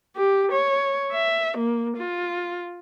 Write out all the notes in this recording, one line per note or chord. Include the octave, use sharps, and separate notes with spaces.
G4
C#5
E5
A#3
F4